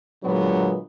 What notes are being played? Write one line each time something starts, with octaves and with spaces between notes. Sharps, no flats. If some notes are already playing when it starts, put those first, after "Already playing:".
A#2 D3 F#3 G#3 B3